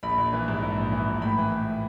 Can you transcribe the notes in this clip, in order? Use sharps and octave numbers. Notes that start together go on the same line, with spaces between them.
A#1 B5
A#1
E3
G#2
A#1
A#1
E3
A#1
A2 B5
E3
A2